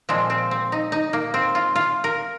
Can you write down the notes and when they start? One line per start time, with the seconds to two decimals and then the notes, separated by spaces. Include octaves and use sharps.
0.09 A#2 F3 G#3 C4
0.30 C4
0.51 C4
0.72 D#4
0.92 D#4
1.13 A#3
1.34 C4
1.55 F4
1.76 F4
2.04 A#4